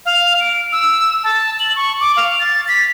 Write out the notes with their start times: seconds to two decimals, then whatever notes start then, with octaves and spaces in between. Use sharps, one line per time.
0.06 F5
0.40 D7
0.72 E6
1.24 A5
1.60 F#7
1.76 C#6
2.00 D6
2.16 F5
2.39 A6
2.68 B6